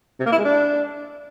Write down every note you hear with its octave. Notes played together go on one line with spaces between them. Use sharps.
C3
A#3
E4
G#3
D4